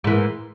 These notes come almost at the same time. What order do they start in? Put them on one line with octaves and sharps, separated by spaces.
G#2 E3 A#3